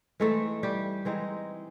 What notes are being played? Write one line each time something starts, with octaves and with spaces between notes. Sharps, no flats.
E3 G#3 A3 C4 D#4 A4
G3 G4
E3 G#3 C4 D#4